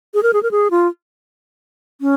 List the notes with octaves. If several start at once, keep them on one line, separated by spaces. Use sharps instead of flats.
G#4
A#4
G#4
A#4
G#4
F4
C#4